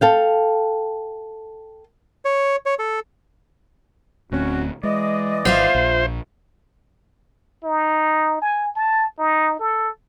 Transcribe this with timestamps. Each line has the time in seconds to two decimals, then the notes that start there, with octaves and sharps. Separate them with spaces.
0.01 A4 F5 G5
2.25 C#5
2.66 C#5
2.79 A4
4.32 D1 D2 C4 C#4 F#4
4.83 E3 G#3 D5 D#5
5.45 G#1 F4 C5 E5 F5
5.75 A#1
7.64 D#4
8.42 G#5
8.76 A5
9.19 D#4
9.59 A4